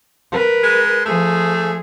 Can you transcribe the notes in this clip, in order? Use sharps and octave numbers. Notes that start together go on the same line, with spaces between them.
A#4 B4
G#3
F3 A3 G#4